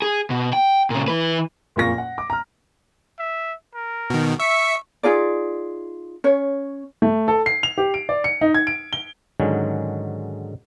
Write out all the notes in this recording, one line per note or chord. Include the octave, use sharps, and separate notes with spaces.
G#4
B2
G5
A#2 C#3
E3 B4
F#1 F2 A#2 A#3 C#6 A#6
F#5
D6
A#5 F6
E5
A#4
B2 D#3
E5 C#6
D#4 F4 G#4 D5
C#4 C#5
A3
A4
C7
F7
G4
D7
D5
C#7
D#4
G#6
D7
G7
G#2 D3 D#3 F#3 G#3 C#4